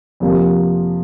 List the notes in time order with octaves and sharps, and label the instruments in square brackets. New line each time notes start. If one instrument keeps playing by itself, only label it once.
[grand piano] F2 C3 F3 A#3